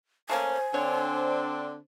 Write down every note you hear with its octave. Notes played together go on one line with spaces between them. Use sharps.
A3 A#3 C#4 C5 G#5
D3 C4 D4 C5 C#5